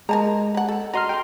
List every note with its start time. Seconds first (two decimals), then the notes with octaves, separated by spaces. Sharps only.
0.09 G#3 A#4 A5 A#5
0.55 B4 F#5
0.69 A4
0.94 F#4 D#5 A#5 C6 F6
1.09 G5 C6